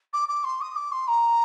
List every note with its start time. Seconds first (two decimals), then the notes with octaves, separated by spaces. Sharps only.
0.13 D6
0.28 D6
0.44 C6
0.61 D#6
0.75 D6
0.91 C6
1.07 A#5